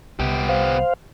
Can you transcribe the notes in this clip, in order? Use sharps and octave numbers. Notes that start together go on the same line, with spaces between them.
C2 B3 G4
C5 F5